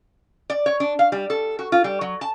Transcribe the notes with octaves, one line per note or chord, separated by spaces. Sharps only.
D5
C#5
D4
F5
G3
A4
F#4
F4
G3
F#3
A5